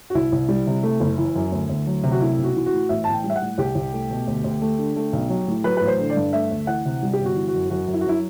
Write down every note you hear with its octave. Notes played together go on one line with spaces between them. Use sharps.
F#4
C2 E4
C2
G3
C3
A3
F#1
E3
F#2
D2
D2
F#3
C3
F#4
A3 E4
B1
F#4
E3
F#4
A2
A1 E5
A1 A5
G5
G3
E5
F#5
A2
C2 G4
C2
A3
B2
D2
D2
A3
D3
A3
B1
F#3
A2
F#3 B4
A1 B4
C5
D3
D5
G2
A3 E5
D2
E3 F#5
C3
G3
G4
G1
F#4
E3
F#4
F#2
F#2 F#4
F#2
E4
F#4
F#3 E4